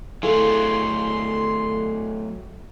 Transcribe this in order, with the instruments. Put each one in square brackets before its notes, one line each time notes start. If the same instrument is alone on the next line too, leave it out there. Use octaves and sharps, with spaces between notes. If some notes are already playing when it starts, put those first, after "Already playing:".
[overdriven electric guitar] F#3 A3 [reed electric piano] E4 G#4 F5 [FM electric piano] A4 G#5 [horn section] C6